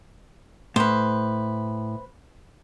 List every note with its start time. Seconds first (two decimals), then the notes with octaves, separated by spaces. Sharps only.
0.76 A2 B4 C5